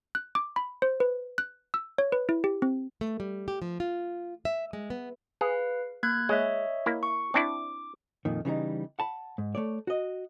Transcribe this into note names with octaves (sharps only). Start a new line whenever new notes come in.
F#6
D6
B5
C5
B4
F#6
E6
C#5
B4
E4
G4
C4
A3
G3
G4
F3
F4
E5
G#3
B3
G#4 B4 F5
A#3 F#6 G#6
G#3 C#5 D#5 E5
A#3 E4
C#6
C4 D4 E4 D6
F2 A#2 D#3
C#3 E3 G3 D#4
F#5 A5 B5
G#2
A3 C#5 D5
F#4 D#5